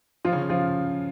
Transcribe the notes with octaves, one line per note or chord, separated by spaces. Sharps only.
F3 F4
C#3 C#4
F3 F4